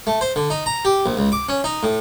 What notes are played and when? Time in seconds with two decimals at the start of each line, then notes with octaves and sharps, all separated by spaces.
0.07 A3
0.21 C5
0.36 D3
0.50 D#4
0.66 A#5
0.85 G4
1.06 A#1
1.17 C#2
1.32 D6
1.49 C#4
1.64 D#4
1.83 A2